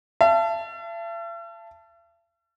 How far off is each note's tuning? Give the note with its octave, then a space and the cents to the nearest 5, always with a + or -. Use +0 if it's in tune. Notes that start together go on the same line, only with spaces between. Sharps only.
E5 +45 A5 +0